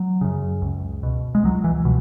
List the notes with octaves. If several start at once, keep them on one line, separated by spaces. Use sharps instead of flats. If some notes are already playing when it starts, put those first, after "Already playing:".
Already playing: F#3
F#2 C#3
C#2
B2
G#3
C#2 F#3
E3
B2